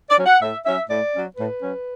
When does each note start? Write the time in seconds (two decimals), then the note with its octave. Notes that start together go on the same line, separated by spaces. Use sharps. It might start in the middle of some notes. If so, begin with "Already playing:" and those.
0.10 D5
0.18 F#3 C#4
0.26 F#5
0.42 A2 E5
0.66 F#3 C#4 E5
0.89 A2 D5
1.14 F#3 C#4
1.37 A2 B4
1.62 F#3 C#4